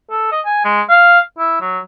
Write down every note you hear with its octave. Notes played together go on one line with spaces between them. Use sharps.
A4
D#5
G#5
G#3
F5
E4
F#3